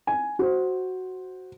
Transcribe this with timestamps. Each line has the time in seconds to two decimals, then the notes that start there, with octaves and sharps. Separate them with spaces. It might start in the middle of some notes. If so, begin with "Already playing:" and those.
0.07 G#5
0.39 F#4 C5